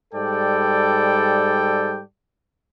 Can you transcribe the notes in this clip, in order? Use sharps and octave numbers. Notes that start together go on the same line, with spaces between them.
G#2 G3 A4 D5 G5